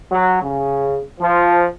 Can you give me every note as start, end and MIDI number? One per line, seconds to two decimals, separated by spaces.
0.11 0.38 54
0.42 1.01 49
1.20 1.65 53